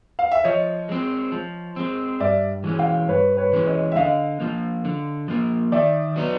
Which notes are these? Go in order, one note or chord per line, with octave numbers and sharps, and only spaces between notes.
F5
E5
F3 C#5 D#5
G#3 C4
F3
G#3 C4
G2 D5 E5
E3 G#3 C#4
F5 G5
G2 B4 C#5
B4 C#5
E3 G#3 C#4
C#5 D#5
E5
D3 D#5 F5
F3 A#3
D3
F3 A#3
D#3 D5 E5
F#3 B3 D#4